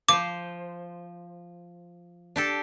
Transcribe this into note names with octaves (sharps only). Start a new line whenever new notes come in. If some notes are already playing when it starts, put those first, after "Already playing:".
F3 C5 D6
D4 G4 A4